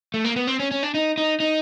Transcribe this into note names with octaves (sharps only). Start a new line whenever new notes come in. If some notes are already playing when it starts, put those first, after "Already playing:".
A3
A#3
B3
C4
C#4
C#4
D4
D#4
D#4
D#4